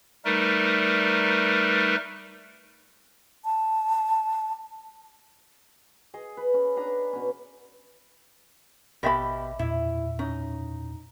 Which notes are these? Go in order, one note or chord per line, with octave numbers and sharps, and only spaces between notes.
G3 A3 D#4 A#4 B4
A5
G#4 D#5
B4
C#4
D4 B4 G#5 A#5
B2 C#4
A1 B2 G4 D#5 E5 B5
E2 A#2 E4
C#4 D#4